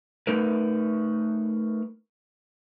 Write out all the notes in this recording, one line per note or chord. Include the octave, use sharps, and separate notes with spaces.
A3 D#4 A#4 B4